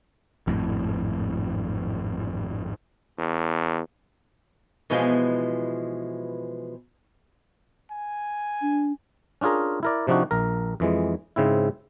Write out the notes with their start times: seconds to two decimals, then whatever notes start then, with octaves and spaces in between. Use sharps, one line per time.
0.47 G#1 F2 A2
3.18 E2
4.90 B2 E3 F3 G#3
7.91 G#5
8.61 D4
9.41 C#4 D4 F4 G#4 A#4
9.83 E4 A#4 D5
10.07 C3 F3 D4 D#4 F#4
10.31 A#1 A#4
10.80 F2 E3 G#3
11.36 G#2 C#3 C4 E4